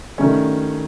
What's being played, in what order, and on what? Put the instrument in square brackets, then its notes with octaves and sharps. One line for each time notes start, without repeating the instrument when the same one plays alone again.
[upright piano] G2 D#3 F#3 A3 C#4